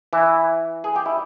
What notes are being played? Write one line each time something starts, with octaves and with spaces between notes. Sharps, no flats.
E3 E4
G#4
G4
E4